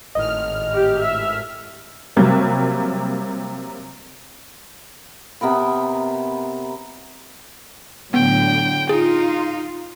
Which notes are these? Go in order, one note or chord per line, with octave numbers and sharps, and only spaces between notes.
G#1 A2 D#5 F6
G4
E5
C3 F#3 G3 A#3
C3 B3 A#4 B5
A2 D3 F#3 B3 G5
D#4 F4 G#4